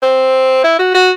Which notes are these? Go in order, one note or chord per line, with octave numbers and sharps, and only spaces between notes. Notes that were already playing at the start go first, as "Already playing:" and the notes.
C4
E4
F#4
F#4